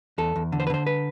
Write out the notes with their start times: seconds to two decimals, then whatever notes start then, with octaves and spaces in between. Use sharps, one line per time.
0.18 E2 A4
0.36 E2
0.52 D3
0.60 C5
0.67 B4
0.70 D3 C5
0.87 B4